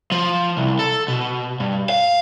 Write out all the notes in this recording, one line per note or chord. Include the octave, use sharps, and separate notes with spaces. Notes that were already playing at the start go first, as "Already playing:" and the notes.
F3
C2
A4
B2
G2
F5